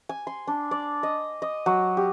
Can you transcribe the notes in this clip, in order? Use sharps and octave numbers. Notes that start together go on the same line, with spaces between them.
G#5
C6
D4
D5
D#5
D#5
F#3
G4